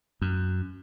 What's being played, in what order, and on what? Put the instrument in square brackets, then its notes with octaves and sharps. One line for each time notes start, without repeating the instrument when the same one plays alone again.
[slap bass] F#2